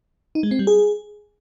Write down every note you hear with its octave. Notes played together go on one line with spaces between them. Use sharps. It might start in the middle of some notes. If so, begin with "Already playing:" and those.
D#4
G#3
C4
G3
G#4